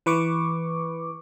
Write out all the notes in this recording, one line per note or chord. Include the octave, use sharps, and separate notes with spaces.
E3 B4 C#6 D6